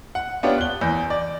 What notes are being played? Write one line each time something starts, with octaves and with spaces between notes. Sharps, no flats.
F#5
B3 D4 F4 G4 C#5
F#6 G7
E2 G6
D5